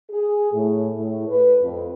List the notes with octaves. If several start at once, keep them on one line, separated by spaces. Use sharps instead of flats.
G#4
A2
A2
B4
F2